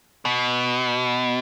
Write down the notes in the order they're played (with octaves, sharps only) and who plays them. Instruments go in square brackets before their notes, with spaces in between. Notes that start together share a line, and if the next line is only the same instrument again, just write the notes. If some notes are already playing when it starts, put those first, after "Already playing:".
[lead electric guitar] B2